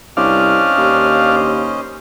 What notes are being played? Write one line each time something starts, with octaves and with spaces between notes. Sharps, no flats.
C2 C#4 D4 C5 D#5 F5
D#2